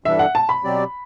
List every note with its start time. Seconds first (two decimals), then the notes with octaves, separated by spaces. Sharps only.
0.04 G2 E3 G3 D4 A4 E5
0.19 F#5
0.35 A5
0.49 B5
0.64 B2 F#3 C4 G4 D5